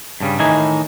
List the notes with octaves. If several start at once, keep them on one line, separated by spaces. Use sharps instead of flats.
G2 C#3 G3
A2 D#3 E3 D#4 G#5